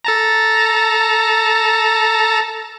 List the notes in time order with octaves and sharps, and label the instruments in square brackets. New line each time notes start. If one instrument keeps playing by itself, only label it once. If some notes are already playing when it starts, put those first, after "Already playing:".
[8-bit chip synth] A4 A5 A#5